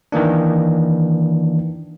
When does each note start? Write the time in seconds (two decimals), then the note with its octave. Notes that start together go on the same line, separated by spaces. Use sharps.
0.12 D#3 E3 A#3 D4